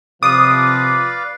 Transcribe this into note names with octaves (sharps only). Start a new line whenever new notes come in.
C3 F3 B4 D5 F5 D6 D#6